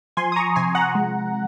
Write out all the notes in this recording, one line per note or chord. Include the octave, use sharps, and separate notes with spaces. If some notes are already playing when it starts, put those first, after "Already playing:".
F3 G#5 C6
D#6
A#5 C#6
C3 G#5 C6
F#5 A#5
G#3